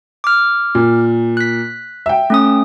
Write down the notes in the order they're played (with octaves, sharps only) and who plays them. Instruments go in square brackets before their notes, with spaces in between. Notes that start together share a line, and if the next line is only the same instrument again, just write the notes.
[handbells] D6 F6
[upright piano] A#2
[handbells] F#6 B6
[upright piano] E5 G5
[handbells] A3 C#4 D#6